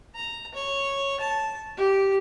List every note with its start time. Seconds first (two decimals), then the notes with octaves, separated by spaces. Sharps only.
0.15 A#5
0.54 C#5
1.20 A5
1.77 G4